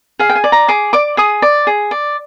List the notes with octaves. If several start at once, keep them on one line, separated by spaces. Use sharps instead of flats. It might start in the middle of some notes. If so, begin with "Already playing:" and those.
G#4 F5
G5
G#5
D5
A#5
G#4 D6
D5 D6
G#4 D#6
D5
G#4
D5